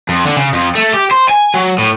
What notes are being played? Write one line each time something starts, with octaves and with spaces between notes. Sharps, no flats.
F2
D3
C#3
F2
A3
G4
C5
G#5
F#3
A2